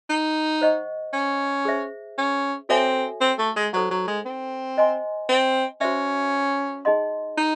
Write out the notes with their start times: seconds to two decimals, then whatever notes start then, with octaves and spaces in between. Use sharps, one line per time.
0.09 D#4
0.62 C5 D#5 F#5 C#6
1.13 C#4
1.65 G#4 C5 E5
2.18 C#4
2.69 C4 F#4 A4 C#5 E5 G#5
3.21 C4
3.39 A3
3.56 G#3
3.73 F#3 D#4 A4 C5 F#5
3.90 F#3
4.07 G#3
4.25 C4
4.77 C5 D#5 G#5 C6
5.29 C4
5.81 C#4 F#4 C5 E5
6.85 D#4 G#4 D#5 F#5 C6
7.38 D#4